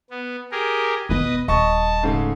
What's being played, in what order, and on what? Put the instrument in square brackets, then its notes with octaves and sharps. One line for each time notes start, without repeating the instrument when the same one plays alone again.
[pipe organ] B3
G4 G#4 A#4
[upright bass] E1 B3 [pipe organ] B4 D#5
[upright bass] D#1 [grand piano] D#5 C#6 [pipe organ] A5
[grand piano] G#2 C#3 A3